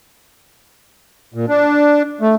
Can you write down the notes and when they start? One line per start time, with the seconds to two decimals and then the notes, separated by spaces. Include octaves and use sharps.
1.34 A#2
1.49 D4
2.21 A3